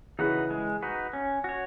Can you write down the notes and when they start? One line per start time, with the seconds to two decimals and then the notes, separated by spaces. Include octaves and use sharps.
0.19 C#3 E3 D#4 F#4 B4
0.51 G#3
0.83 D#4 F#4 B4
1.13 C#4
1.44 F#4 C#5